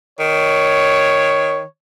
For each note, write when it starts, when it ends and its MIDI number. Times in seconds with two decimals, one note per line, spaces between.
0.20 1.62 51
0.20 1.65 73